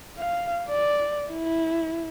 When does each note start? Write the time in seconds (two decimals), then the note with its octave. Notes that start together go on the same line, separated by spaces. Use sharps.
0.17 F5
0.69 D5
1.30 E4